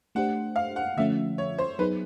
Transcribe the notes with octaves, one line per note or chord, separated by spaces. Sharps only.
A3 D4 G4 C5 F#5
F5
F#5
D3 F3 A3 C#4 F4 E5
C#5
C5
F#3 B3 D#4 G#4 B4